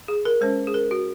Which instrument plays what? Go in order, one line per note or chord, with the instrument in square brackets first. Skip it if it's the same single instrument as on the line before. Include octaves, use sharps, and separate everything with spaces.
[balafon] G#4
A#4
G#3 C#4 C5
G#4
A#4
F#4